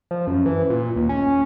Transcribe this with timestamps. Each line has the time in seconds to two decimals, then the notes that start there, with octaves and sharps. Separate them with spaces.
0.11 F3
0.27 F#2
0.46 E3
0.70 A#2
0.96 D#2
1.09 C#4